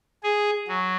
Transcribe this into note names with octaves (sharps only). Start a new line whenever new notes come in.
G#4
F#3